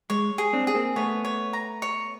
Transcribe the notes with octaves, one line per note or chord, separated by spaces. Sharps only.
G#3 C#5
G#4
C4 D4
G#4
A#3 C4
A3 B3 C#5
C#5
A#5
C#5